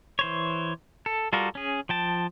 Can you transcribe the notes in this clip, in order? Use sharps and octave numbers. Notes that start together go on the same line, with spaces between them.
E3 C5 C#5
A4
G3 F4 F#4 A4 A#4
C#4 G#4
F3 G5 A5